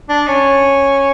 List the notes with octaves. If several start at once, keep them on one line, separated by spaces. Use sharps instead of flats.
D4
C#4